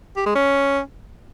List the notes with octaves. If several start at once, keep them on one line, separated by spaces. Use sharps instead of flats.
G4
G#3
C#4